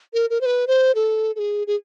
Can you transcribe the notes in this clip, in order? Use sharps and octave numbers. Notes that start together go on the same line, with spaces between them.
A#4
A#4
C5
B4
C5
A4
A4
G#4
G#4